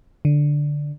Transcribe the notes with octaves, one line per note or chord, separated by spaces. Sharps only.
D3